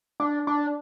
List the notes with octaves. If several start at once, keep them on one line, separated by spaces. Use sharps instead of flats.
D4
D4